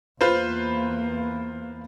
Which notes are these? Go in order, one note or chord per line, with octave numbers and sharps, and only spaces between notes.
E2 A#3 F4 B4 C5